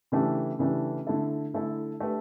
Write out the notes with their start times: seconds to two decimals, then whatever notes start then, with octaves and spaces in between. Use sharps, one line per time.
0.12 C#3 E3 A3 D4 G4
0.59 C#3 E3 A3 D4 G4
1.07 D3 A3 E4 A4
1.54 D3 A3 E4 A4
2.00 A3 D4 G4 B4